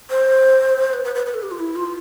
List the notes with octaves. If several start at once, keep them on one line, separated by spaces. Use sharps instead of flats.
C5
B4
B4
B4
B4
A4
G4
F4
E4
F4